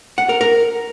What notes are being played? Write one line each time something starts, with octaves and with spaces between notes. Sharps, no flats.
F#5
A#4
A#4